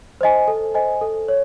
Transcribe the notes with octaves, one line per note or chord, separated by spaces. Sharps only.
C5 D#5 G#5
A4
C5 D#5 G#5
A4
C#5